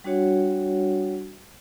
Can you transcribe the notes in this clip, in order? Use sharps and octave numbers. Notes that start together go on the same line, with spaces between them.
G3 D4 F#4 C#5 F#5